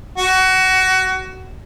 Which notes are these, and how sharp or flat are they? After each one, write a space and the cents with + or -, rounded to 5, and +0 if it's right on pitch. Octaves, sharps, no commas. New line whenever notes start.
F#4 +20